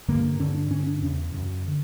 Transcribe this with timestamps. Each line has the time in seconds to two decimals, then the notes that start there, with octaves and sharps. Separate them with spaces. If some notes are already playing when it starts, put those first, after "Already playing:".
0.08 G2 D3 A#3
0.39 G2 D3 C#4
0.55 D4
0.70 G2 D3 C#4
0.87 D4
1.02 E2 C#3 C#4
1.33 F#2 C#3
1.68 D3